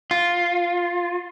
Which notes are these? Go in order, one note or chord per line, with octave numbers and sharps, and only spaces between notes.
F4